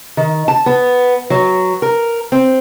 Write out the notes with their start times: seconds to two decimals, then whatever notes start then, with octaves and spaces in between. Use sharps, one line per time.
0.17 D#3
0.48 A5
0.66 B3
1.30 F#3
1.82 A#4
2.32 C4